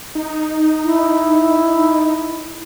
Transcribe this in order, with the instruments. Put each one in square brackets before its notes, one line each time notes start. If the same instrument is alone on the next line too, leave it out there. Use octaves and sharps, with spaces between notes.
[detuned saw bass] D#4
[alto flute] E4